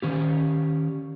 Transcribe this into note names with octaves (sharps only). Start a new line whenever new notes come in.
D#3 C#4 G4